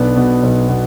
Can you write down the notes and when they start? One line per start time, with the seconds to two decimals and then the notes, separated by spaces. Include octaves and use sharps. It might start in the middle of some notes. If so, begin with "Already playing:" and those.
Already playing: B1 B2 B3 D4
0.16 B2
0.43 B1
0.69 B2